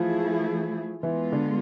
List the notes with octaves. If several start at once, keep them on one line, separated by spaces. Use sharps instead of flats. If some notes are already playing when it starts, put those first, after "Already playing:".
Already playing: E3 F3 A3 E4 F4 G#4
E3 G#3 B3 E4 F4
D3 D4